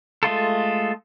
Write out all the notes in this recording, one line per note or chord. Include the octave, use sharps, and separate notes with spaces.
G#3 A3 F4 A4